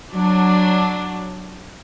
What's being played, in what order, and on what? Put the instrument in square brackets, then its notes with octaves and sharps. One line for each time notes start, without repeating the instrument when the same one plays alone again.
[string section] F#3 D4